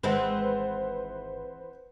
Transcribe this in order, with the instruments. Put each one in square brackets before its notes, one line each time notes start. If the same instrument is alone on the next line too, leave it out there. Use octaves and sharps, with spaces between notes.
[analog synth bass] G#1 [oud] E3 G#3 C4 [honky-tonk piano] B4 C5 F#5